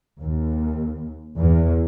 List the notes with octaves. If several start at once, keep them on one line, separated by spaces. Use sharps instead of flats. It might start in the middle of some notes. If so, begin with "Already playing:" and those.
D#2
E2